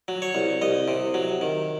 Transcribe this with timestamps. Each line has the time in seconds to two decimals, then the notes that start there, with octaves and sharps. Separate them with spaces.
0.08 F#3
0.22 C#5
0.35 C2
0.62 C2 D#5
0.88 C3
1.14 F#3
1.41 D#3